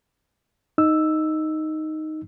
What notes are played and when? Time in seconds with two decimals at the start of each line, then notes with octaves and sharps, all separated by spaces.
0.78 D#4 E6